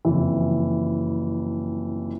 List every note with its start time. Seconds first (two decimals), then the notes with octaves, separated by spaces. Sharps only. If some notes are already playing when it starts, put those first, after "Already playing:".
0.05 F#1 F2 E3